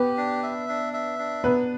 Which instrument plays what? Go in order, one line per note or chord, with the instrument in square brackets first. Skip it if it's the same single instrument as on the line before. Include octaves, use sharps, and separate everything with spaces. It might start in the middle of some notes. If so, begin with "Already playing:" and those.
Already playing: [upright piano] B3 B4 [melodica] G4
[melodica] D4
E5
D4
E5
D4
[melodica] F#3 [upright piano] B3 B4